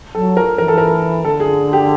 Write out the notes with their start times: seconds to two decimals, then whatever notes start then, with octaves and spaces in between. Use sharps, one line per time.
0.15 F#3 A4
0.37 F3 A#4
0.58 E3 A#4
0.68 A4
0.78 A#4
1.24 D3 A4
1.40 G#4
1.73 G4